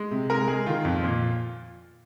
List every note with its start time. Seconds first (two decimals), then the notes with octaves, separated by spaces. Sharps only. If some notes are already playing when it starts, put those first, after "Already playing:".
Already playing: G#3
0.11 C3
0.30 G#3 A#4
0.48 G#3 G#4
0.66 D#3 F4
0.85 F2
1.03 A#2